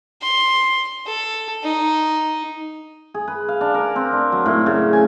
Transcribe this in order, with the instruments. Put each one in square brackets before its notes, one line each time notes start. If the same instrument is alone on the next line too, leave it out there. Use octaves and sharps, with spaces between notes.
[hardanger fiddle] C6
A4
D#4
[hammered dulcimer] G#4
B4
F5
D4
A#4
C4
D4
F#3
A2
C#3
G#5